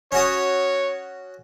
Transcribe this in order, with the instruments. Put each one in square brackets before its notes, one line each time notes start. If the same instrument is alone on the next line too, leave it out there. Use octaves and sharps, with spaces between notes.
[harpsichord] C#4 F#4 D#6 [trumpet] C#5